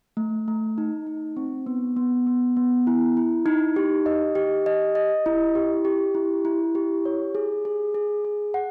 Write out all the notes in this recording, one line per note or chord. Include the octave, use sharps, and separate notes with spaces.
A3
A3
D#4
D#4
C4
B3
B3
B3
B3
E4
E4
D#4
G4
D#5
G4
D#5
D#5
E4
G4
G4
E4
E4
G4
C#5
G#4
G#4
G#4
G#4
F#5